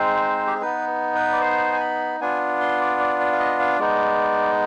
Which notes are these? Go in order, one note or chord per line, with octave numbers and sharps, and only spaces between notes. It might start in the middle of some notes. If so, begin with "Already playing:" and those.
Already playing: G#3 C4 D#4 C5
G4
G#4
B3 D#4 B4
B4
D5
C5
G#5
B5
B3 D4 F4 G#5
C6
D5
D5
D5
F5
D#5
F5
G#3 B3 D#4 D5